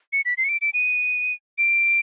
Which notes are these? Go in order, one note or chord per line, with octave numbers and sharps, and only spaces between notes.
C#7
B6
C7
C#7
D7
D7
D#7
D7